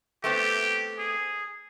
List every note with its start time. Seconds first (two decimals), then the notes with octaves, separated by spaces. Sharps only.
0.24 A3 B3 C4 G4
0.99 G#4